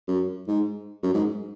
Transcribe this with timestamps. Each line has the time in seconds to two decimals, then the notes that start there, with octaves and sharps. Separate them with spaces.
0.08 F#2
0.47 G#2
1.03 F#2
1.14 G#2